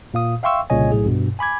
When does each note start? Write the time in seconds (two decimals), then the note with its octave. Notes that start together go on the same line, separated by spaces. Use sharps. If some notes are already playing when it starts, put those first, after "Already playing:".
0.14 A#2 F5 D#6
0.43 E5 F5 G5 C6 C#6 E6
0.70 C2 A#2 C#3 C#5 D#5 G#5
0.92 B1 A2 G#4
1.06 G2 B2
1.39 G#5 B5 D6 G#6